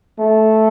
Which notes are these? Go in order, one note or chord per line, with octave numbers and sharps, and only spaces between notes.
A3